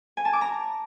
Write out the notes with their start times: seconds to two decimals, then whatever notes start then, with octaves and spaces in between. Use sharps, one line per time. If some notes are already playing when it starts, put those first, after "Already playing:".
0.17 G#5
0.25 A5
0.33 D6
0.41 A#5